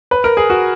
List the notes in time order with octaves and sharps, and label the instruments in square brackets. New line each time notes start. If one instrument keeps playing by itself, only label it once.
[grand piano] B4
A#4
G#4
F#4